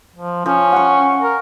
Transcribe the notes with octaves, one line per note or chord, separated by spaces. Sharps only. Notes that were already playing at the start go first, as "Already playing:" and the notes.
F3
F3 C#4
F#5 C#6
A#4